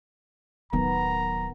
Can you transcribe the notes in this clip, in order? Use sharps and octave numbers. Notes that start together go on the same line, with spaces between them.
D1 D#3 F#3 B3 A#5